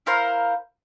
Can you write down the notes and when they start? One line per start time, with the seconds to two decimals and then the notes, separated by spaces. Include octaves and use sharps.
0.06 E4 A#4 C5 F5